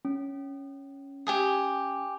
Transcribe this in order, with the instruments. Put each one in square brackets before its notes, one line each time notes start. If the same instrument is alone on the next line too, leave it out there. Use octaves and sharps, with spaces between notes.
[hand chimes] C#4
[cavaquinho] G4 G#5 D#6